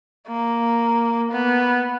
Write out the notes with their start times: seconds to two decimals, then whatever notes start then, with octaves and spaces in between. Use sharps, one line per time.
0.28 A#3
1.31 B3